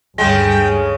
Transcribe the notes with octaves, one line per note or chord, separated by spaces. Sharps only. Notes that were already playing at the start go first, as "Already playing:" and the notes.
D2 G2 C#3 G3 G#3 G5